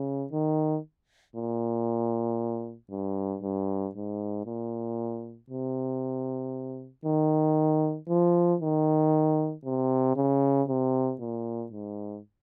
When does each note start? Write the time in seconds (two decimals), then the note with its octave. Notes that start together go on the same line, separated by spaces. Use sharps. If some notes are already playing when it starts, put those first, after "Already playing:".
Already playing: C#3
0.32 D#3
1.36 A#2
2.91 G2
3.43 G2
3.95 G#2
4.46 A#2
5.50 C3
7.05 D#3
8.09 F3
8.61 D#3
9.65 C3
10.16 C#3
10.68 C3
11.20 A#2
11.72 G#2